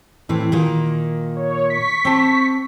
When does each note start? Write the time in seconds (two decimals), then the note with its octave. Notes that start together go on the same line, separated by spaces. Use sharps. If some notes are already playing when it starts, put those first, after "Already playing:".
0.29 A2 E3 C4
0.52 A#2 D#3 A#3
1.36 C#5
1.66 C#6 B6
2.05 C4 A5